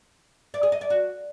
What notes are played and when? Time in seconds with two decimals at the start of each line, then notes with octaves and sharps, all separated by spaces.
0.54 D5
0.63 G#4
0.72 D#5
0.81 D5
0.90 F#4